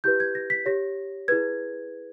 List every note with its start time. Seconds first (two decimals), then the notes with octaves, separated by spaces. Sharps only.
0.04 E4 G4 B4 G6
0.20 G#6
0.35 A#6
0.50 B6
0.66 G4 C#5 A#6
1.28 E4 G#4 B4 G#6